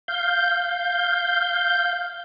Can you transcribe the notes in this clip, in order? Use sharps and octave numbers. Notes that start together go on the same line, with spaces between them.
F5 G6